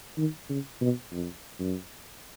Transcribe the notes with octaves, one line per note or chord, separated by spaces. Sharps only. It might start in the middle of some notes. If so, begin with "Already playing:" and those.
D#3
C#3
B2
F2
F#2